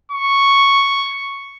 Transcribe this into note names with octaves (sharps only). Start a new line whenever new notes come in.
C#6